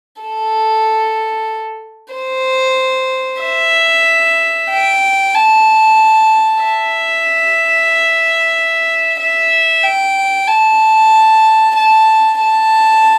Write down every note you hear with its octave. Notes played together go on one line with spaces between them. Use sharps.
A4
C5
E5
G5
A5
E5
E5
G5
A5
A5
A5